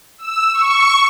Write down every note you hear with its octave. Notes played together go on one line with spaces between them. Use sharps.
E6
C#6